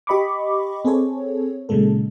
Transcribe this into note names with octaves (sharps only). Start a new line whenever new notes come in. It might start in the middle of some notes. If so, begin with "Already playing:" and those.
G4 D#5 B5 C#6 D6
C4 G#4 A4 C#5
A#2 C#3 F#3 G#3 A4